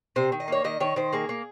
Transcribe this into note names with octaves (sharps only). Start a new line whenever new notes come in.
C3 C5
D#3
D#5
A#3 C#5
D#3 D#5
D#3 C#5
D#3 C5
A#3 G#4
A#3